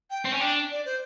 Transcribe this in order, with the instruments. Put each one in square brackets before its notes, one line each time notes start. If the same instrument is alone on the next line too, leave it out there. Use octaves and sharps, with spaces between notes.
[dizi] G5
[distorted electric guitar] C4
C#4
D4
[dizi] D5
C5